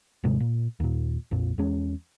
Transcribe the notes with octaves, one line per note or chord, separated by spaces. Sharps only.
D#1 G#2 C3 G#3
A#2
D#2 A#2
A#1 F2 A#2
E2 G#3 C#4